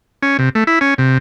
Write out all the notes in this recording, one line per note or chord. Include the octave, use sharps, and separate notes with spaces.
C#4
C3
A3
E4
C#4
C3